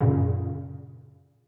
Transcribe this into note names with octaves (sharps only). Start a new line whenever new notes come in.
F#2 A#2 C#3